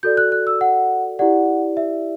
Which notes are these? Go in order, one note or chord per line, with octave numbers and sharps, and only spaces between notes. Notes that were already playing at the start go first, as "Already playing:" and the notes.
F#4 A4 D5 G6
F#6
F#6
E6
F#5
E4 G4 D5 F#5
E5